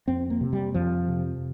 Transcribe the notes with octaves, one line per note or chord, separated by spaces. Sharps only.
F2 C4
A#3
C3
G3
F2 F3
C3